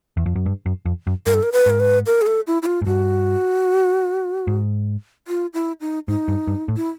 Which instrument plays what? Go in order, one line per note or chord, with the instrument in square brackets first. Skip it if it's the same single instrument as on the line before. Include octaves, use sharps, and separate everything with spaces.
[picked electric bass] E2
F2
F#2
G2
F#2
F2
F#2
[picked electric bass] G2 [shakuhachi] A#4
[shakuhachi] A4
A#4
B4
[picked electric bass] G#2 [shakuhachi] A#4
[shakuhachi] B4
A#4
G#4
A4
E4
E4
F4
[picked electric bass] G#2
[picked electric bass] G2 [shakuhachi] F#4
[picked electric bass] G#2
[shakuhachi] F4
E4
D#4
[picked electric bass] G#2 [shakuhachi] D#4
[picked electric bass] G2
G2
A2
[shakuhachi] E4